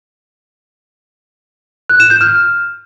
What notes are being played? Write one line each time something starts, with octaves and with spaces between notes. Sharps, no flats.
F#6
E7
G6
F6